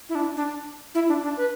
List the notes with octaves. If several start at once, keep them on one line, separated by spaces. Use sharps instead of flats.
E4
D4
D4
E4
D4
D4
B4